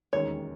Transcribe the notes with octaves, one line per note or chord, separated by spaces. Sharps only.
E1 D#2 D#3 G#3 C#4 C#5